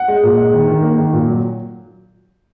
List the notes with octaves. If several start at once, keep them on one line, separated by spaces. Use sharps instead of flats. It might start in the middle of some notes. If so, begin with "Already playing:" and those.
Already playing: F#5
G#3
A#2
G#3
D#3
D#3
A#3
D#3
A#2
F#3